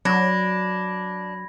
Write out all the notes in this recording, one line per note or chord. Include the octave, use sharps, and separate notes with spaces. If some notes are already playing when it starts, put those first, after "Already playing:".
F#3 D4 B5 G#6 A#6